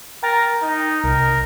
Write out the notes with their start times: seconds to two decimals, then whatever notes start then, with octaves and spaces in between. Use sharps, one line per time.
0.23 A#4 G5 A#5 A6
0.62 D#4
1.04 C2 A#4